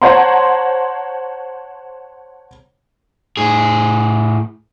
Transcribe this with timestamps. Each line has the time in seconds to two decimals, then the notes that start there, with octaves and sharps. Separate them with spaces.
0.02 C5 C#5 F#5 A5 A#5 C6
3.37 A2 G#4